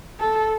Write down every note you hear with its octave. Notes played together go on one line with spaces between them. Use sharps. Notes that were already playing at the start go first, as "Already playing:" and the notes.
A4